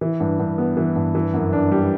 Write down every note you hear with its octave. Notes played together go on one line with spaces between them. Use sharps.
E3
G2
G2
B3
E3
G2
E3
F#2
D4
G3